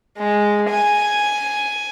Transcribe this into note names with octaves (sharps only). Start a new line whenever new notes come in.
G#3
G#5